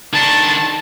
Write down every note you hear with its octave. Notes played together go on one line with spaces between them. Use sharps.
D#3 D4 A5